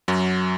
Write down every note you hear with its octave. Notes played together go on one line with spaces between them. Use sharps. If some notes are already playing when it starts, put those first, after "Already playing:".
F#2 F#3